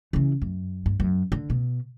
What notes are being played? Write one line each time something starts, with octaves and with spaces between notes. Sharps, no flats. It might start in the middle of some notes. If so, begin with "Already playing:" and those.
C#3 E3
F#2
G2
F#2
D3
B2